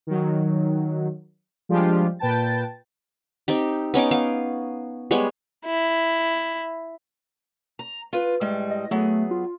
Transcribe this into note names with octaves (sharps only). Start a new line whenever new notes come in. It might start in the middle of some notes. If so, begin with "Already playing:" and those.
D#3 F#3
F3 G3 G#3 D4 F4 G4
A#2 B4 G5 A5 A6
C4 D#4 G4
B3 C#4 D#4 D6
B3 F5
G3 G#3 B3 C#5
E4
A#5
F4 B4
A2 G3 G#3
D#5
F#3 A3 B3 G#4
F4